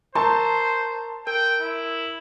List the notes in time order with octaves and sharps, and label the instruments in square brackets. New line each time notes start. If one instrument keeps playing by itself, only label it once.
[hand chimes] A#4 A#5 C#6 [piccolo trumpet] C5 [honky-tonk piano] A5 C6
[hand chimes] A#4 [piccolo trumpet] G5
[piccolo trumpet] E4